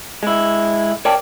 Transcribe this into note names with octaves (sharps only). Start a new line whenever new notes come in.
G#3 E4
A#4 C#5 D5 G5 A5